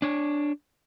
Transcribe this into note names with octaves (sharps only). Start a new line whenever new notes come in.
D4 C#5